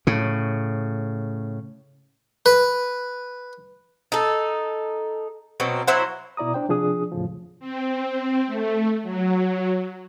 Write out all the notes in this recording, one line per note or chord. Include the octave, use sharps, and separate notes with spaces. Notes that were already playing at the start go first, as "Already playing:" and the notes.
A2 C#3
B4
D#4 A4
B2 F#3 C4
F#3 E4 C5 F#5
B2 E4 D5 A#5 D#6
D4 C5 G5
C3 F3 D4 G#4 D#6
E2 A2 C#3 F3
C4
A3
F#3